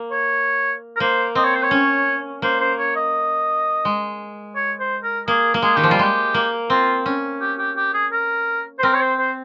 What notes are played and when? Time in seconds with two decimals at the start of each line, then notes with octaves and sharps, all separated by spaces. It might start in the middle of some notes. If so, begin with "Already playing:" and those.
Already playing: A#3
0.11 C#5
0.96 A#4
1.00 A#3 C5
1.35 C4 D#5
1.44 C#5
1.55 C5
1.63 C#5
1.71 C#4
2.42 A#3 C5
2.60 C5
2.79 C#5
2.96 D#5
3.85 G#3
4.56 C#5
4.80 C5
5.03 A#4
5.27 A#3 G#4
5.54 A#3
5.62 G#3 G#4
5.76 D#3 G4
5.83 F3
5.90 G3 F4
5.99 G#3 G4
6.34 A#3
6.70 C4 F4
7.06 C#4
7.41 G4
7.58 G4
7.76 G4
7.94 G#4
8.12 A#4
8.79 C5
8.83 C4 A#4
8.93 C#5
9.01 C5
9.19 C5